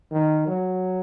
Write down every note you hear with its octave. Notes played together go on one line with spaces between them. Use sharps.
D#3
F#3